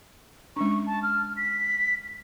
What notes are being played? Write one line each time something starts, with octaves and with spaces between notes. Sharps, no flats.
G#3 C#4 D4 C#6
A5
F6
B6